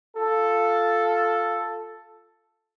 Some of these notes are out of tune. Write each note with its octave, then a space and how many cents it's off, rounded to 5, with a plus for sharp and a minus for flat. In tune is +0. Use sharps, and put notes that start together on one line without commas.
F4 +0 A4 +0